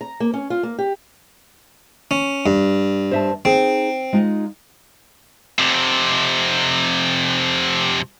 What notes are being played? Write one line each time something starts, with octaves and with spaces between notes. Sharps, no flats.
A#5
A#3
C#4
F4
A#3
G4
C#4
G2
C5 E5 A5
C4 D#4 G#4
G#3 D#4 F4
F2 C3